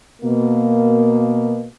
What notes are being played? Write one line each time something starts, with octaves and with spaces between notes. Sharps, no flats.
B2 A#3